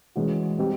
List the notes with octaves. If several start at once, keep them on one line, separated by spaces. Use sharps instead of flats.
E3 G#3 C#4 F#4
G3 C4 D#4 G4